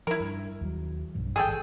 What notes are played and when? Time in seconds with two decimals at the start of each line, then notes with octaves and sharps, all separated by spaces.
0.07 F3 E4 A#4
0.20 G2
0.61 D#2 F#3
1.15 B1 G2 F3
1.36 G#1 G#2 G#4 A4 G5